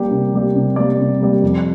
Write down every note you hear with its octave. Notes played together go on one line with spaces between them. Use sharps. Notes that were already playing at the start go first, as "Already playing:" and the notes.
Already playing: G3 A#3 G4 D5
C3
G3 A#3 G4 D5
C3
G3 A#3 G4 D5
C3
G3 A#3 G4 D5
F2